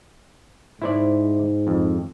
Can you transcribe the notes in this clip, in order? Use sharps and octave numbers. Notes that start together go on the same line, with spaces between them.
G#2 E4 C5 D5
F2